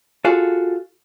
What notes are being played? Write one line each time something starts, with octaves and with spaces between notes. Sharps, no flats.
F4 F#4 G#4 A4